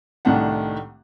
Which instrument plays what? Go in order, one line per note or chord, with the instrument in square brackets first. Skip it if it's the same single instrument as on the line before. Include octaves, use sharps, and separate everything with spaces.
[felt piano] C2 A2 D#3 A3 D4 F#5